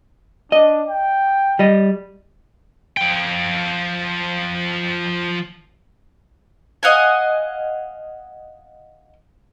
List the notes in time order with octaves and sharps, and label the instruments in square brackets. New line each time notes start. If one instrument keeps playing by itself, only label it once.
[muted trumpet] D4 [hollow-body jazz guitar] D#5
[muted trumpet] G5
[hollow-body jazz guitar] G3 D#5
[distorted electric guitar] F3 G5
[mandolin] D#5 F5 F#5 G#5